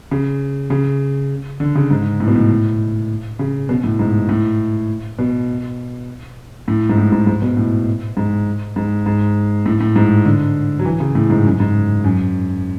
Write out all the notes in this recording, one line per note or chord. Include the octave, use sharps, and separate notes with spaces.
C#3
C#3
D3
C#3
G#2
A2
B2
A2
C#3
B2
A2
G#2
A2
B2
A2
G#2
A2
G#2
G#2
B2
A2
G#2
G#2
G#2
A2
A2
G#2
D3
F#3
E3
C#3
A2
G#2
F#2
G#2
F#2